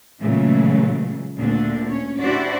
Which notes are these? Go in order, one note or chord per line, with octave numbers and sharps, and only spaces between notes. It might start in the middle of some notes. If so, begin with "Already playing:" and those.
A#2 C#3 E3 F#3 G#3 A3
D2 A#2 D3 D4
C#4 C#5
D4 E4 F#4 G4 C5 D5